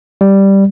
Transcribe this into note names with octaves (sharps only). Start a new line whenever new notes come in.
G3